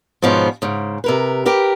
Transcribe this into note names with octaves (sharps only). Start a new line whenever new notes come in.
G#2 B2 F3 B3 C#4
G#2 C#3
C3 A#4 B4
G4 A#4 B4